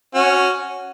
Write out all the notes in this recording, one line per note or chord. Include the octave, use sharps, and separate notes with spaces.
C#4 F#4